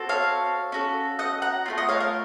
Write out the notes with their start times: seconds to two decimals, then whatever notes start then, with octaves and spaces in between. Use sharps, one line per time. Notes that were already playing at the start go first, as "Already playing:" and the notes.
Already playing: C4 F#4 A4
0.09 C#5 F5
0.72 C#4 F#4 A4
1.19 D#5 F#5
1.42 F#5 A#5
1.66 A3 C4 F4
1.78 D#5 F#5
1.88 C#5 F5
2.00 A#4